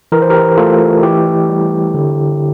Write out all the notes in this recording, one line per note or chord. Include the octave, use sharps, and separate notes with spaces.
E3 A#4
C5
G4 A#4
A3 F4 A4
E3 E4 G4
G3
D3